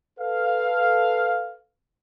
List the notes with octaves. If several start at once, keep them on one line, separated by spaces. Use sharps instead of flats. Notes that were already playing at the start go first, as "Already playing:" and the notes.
A4 B4 F5